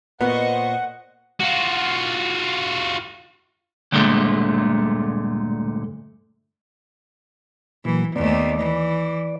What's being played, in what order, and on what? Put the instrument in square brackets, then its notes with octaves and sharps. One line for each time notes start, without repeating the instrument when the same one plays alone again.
[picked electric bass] A#2 [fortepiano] B3 [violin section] C5 D#5 C#6 [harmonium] F#5
[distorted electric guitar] F4 F#4
[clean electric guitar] D2 G2 A#2 D3 G#3 A3
[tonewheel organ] A#2 F#3 A#3 [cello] E3
[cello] D#2 A3 [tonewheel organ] B3 D5
[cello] E3 [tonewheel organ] D5